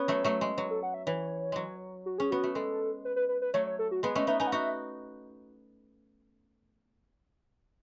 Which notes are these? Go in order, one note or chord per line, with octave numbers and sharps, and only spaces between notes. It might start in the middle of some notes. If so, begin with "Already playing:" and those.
Already playing: B3 C#4 C#5
F#3 A3
F#3 A3
G#3
F#3 B4
A4
F#5
E5
E3 C#5
F#3 G#3
F#4
C#4 G#4
B3 F#4
A3
G#3 A4
B4
B4
B4
B4
F#3 A3 C#5
C#5
A4
F#4
G#3 B3 G#4
A3 C#4 D#5
B3 D#4 E5
B3 D#4 G#5
F#5
D#4 F#4 E5